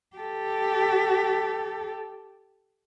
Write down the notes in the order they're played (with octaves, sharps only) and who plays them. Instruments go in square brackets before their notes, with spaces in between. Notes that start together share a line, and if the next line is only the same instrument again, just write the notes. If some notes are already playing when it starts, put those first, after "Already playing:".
[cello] G4 A4